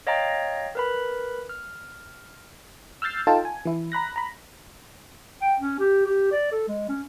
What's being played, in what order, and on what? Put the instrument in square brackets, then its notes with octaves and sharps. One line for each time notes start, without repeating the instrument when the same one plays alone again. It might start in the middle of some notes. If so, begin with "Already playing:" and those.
[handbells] C#5 D#5 F5 G5 A#5 A6
A#4 B4 B5
F6
[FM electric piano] E6 F6 G6 A6 C7
D#4 F4 A4 G5 A5
G#5
E3 E4
A#5 B5 F#6 A#6
A#5 B5
[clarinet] G5
C#4
G4
G4
D5
A4
G#3
C#4